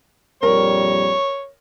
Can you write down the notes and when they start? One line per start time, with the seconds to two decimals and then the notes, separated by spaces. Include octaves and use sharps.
0.43 A#1 F2 G3 A#4 C#5